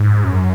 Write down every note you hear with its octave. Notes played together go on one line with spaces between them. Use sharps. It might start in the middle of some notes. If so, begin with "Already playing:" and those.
Already playing: G#2
F#2